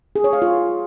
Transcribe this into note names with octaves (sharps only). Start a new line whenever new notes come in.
G#4
C#5
F5
F4